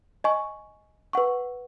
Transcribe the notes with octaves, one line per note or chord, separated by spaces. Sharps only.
D#5 G#5 C#6
B4 F#5 C#6